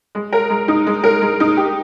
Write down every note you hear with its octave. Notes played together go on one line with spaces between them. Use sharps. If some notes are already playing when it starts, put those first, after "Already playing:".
G#3
A#4
G#3
D#4
G#3
A#4
G#3
D#4
G4